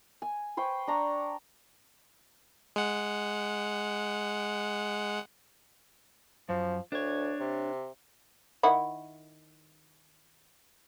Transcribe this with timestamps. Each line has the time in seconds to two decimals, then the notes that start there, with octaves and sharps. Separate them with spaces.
0.22 G#5
0.57 B4 C5 G5 C#6
0.87 D4 A#5 C#6
2.76 G#3 F#5
6.49 F#2 F3
6.92 D2 D4 C#5
7.40 C3
8.63 D#3 E4 F#5